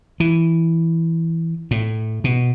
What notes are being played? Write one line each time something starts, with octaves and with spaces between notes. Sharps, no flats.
E3
A2
B2